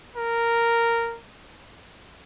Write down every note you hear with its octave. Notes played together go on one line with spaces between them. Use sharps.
A#4